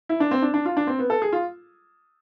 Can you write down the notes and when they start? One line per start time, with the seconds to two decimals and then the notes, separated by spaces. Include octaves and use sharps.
0.09 E4
0.20 D4
0.31 C4
0.42 D4
0.54 D4
0.65 F4
0.77 D4
0.87 C4
0.99 B3
1.10 A4
1.22 G#4
1.33 F4